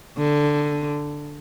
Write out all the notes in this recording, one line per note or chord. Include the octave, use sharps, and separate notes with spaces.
D3